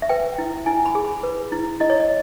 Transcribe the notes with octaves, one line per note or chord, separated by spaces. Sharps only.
E5
B4 G5
E4
E4 G#5
B5
G#4
B5
B4
E4
E4 D#5
C#5
D#5